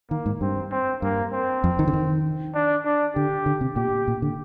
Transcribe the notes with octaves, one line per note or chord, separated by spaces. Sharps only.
D#3 A#3
G#2
G2 C4
C4
G2 A#3
C4
F2
D#3
D3
D#3
D4
D4
D3 G4
D3
C3
A#2 G4
A#2
D3